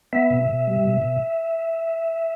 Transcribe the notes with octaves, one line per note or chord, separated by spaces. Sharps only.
B3 E5
B2
B2
G3
B2
B2